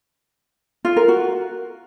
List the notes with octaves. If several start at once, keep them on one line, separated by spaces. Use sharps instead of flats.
F4
A#4
F#4